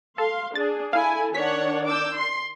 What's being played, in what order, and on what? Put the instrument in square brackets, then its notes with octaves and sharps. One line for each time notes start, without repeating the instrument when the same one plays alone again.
[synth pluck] A4 [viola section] F5 C6
[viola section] D4 G#4 [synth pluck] A6
[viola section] E4 A4 [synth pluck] F5 [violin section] G#5
[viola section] D#3 D4 [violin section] C#5 F#5 [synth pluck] B6
[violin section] D6 E6 G6
C6